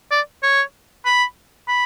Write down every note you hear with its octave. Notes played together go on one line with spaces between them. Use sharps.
D5
C#5
B5
B5